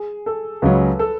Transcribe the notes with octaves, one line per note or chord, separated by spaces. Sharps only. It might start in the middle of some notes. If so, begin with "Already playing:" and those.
Already playing: G#4
A4
C#2 C#3 F#3 C#4 B4
A4